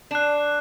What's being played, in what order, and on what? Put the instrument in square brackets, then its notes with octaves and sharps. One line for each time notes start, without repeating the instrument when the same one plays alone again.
[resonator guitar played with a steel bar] D4 [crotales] F#6 C7 E7